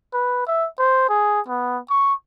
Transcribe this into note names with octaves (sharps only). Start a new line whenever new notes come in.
B4
E5
C5
G#4
B3
C#6